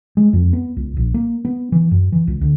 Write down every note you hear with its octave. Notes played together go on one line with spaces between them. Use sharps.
G#3
F2
B3
C#2
A#1
A#3
B3
E3
F#2
E3
C#2
D2